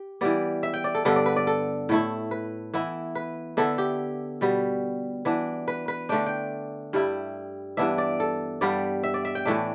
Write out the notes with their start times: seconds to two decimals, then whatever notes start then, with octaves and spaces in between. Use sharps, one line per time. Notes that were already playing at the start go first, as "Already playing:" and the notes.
Already playing: G4
0.21 E3 G3 B3 D5
0.63 E5
0.74 G5
0.84 D5
0.95 A4
1.05 G2 D3 B3 A4
1.16 D5
1.26 B4
1.36 D5
1.47 A4
1.89 A2 A3 E4
2.31 B4
2.74 E3 B3 E4
3.15 B4
3.57 D3 B3 E4 A4
3.78 G4
4.41 B2 G3 B3
5.25 E3 B3 D4
5.68 B4
5.88 B4
6.09 D3 A3 D4 G5
6.26 G5
6.93 G2 G3 E4
7.77 G2 E3 B3 D4 E5
7.98 D5
8.20 A4
8.61 G2 G3 B3 D5
9.03 E5
9.14 D5
9.25 E5
9.35 G5
9.45 A2 E3 A3 D4 E5